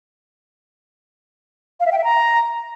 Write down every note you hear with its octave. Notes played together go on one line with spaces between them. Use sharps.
F5
E5
G5
E5
A#5